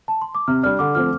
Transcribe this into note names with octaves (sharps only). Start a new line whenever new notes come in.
A5
C6
D6
C3 F6
G3 D4 F6
D3 D6
F3 A3 C4 F6